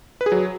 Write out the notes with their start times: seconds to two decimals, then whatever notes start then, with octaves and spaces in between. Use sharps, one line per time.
0.21 B4
0.26 G#4
0.32 F#3